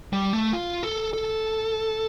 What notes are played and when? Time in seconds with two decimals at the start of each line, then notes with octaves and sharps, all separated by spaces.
0.13 G3
0.33 A3
0.53 F4
0.83 A4
1.13 A4